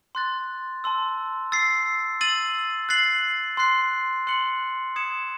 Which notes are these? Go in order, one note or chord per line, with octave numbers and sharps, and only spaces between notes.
C6 F#6 A6
A5 C6 E6
E6 A6 C7
E6 A6 D#7 F#7
F#6 A6 C7 F#7
C6 F#6 C7
C6 F#6 C#7 F#7
D#6 G#6 C#7 E7